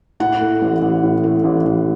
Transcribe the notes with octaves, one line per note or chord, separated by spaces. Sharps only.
A2 F#5
A3
A1
A1
A2
A3
A1
A1